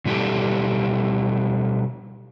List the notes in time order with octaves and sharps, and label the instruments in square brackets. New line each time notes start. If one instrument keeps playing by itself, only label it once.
[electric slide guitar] B2 G3 E4 G4 A4